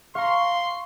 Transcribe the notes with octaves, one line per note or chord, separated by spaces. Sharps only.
F5 A#5 C6 C#6